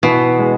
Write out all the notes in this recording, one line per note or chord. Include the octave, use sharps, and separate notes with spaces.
B2 E3
G#3